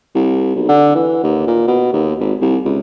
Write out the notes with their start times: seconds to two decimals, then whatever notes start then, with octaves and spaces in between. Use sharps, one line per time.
0.15 C2
0.56 B1
0.69 D3
0.95 E3
1.24 D#2
1.48 A#2
1.67 B2
1.93 D#2
2.20 G#1
2.41 C2
2.65 C#2